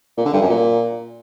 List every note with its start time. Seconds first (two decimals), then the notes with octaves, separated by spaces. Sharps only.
0.17 A#2
0.25 D3
0.33 G2
0.41 F#2
0.49 A#2